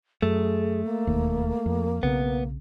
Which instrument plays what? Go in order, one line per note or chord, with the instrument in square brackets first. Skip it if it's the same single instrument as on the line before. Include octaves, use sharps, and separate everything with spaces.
[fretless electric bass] F#2 [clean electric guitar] A3 [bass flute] G#4
[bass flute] A#3
[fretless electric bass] E1 D#2
F2
[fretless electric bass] B1 C#3 C4 [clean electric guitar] B3